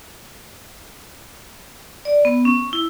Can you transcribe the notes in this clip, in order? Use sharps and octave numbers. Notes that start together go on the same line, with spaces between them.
D5
B3
C#4
E4